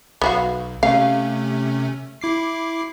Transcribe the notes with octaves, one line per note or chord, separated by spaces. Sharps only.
B1 B3 F#4 F5
C3 A3 C#4 F5
E4 D6 C7